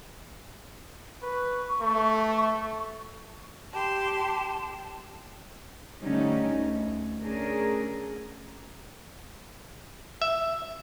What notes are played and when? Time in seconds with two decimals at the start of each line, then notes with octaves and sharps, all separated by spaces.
1.22 B4 C#6
1.81 A3
3.73 G4 A5 C6
6.01 D3 G3 A3 C#4 D#4
6.48 D2
7.22 A3 C#4 D4 G#4 A#4
10.22 E5